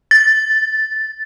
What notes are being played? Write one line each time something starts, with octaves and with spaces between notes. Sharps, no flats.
A6